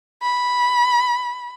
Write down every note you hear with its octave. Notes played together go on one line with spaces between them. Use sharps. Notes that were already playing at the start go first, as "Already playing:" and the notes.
B5